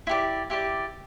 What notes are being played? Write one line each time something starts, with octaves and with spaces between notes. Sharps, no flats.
E4 G4 D5
E4 G4 D5